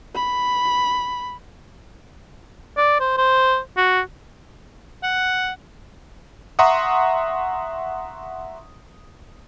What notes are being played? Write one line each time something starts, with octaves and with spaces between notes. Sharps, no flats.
B5
D5
C5
C5
F#4
F#5
E5 F#5 A#5 C6 C#6 D#6